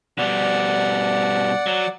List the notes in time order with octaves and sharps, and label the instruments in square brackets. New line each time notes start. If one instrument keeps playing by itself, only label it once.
[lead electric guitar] B2 G3 [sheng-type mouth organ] D5 F#5
[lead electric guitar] F#3